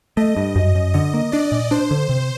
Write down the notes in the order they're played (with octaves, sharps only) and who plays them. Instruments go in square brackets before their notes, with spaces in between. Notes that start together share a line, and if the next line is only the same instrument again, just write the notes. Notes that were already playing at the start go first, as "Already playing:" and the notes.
[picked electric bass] A3 [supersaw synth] D#5
[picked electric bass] G2
F#2
F#2
[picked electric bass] D3 [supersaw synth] D#5
[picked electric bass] A#3
[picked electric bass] D4 [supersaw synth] D5
[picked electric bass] A#2
[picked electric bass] D4 [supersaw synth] C5
[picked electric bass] D3
C3